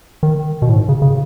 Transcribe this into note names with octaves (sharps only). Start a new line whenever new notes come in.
D#3
B2
A2
G#2
C#3
C#3